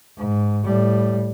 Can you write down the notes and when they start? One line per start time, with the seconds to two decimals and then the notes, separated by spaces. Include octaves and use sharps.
0.18 G#2
0.64 A2 G3